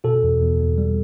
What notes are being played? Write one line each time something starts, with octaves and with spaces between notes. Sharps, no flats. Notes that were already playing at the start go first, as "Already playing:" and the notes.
B2 F#4 A4
E2
E2
E2
G3